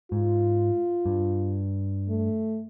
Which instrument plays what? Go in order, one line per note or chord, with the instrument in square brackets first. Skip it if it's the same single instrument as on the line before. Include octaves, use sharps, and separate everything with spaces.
[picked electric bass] G#2 [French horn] F4
[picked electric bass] G2
[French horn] A3